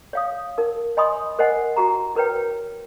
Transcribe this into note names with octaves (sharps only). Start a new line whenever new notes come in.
C#5 F5 D#6
D#4 A#4
C#5 D#5 G#5 B5 C6 D#6
A#4 C5 D#5 F#5 G#5
E4 F#4 G4 A#5
E4 A#4 B4 C#5 G5